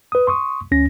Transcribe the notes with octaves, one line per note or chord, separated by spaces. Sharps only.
B4 D#6
C6 C#6 D#6
D2 C#4 A#6